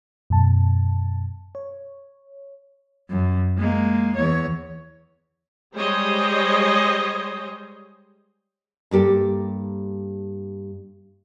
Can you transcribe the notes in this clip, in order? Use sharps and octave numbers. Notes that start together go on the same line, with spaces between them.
F#2 B2 A5
C#5
F#2
G#3 A#3
E2 C#5
G3 G#3 C5 C#5 D#5
G2 A#3 G4 A4